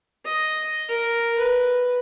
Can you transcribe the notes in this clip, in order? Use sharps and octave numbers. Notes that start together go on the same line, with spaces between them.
D#5
A#4
B4